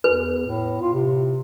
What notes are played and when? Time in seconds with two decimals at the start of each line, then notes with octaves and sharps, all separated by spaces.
0.04 E2 B4
0.47 A2
0.81 F4
0.93 C3